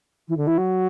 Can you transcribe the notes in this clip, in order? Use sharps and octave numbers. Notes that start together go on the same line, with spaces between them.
E3
D3
E3
F#3